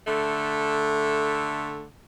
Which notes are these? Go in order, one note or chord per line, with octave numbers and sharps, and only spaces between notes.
D3 A3